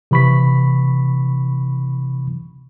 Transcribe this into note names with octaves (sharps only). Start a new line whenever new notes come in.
C3 E3 B5 C#6 B6